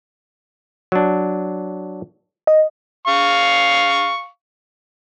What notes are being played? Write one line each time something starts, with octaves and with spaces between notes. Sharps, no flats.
F#3 D4
D#5
F5 C#6